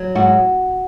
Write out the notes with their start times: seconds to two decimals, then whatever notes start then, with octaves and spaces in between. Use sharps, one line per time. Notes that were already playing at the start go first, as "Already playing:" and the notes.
Already playing: F#3
0.15 G#2 F#4